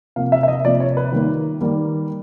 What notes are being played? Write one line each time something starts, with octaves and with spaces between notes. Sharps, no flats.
C3 F3 A#3 F5
E5
E5
D#5
C3 F3 A#3 D5
C#5
B4
D#3 G3 A#3
D#3 G3 A#3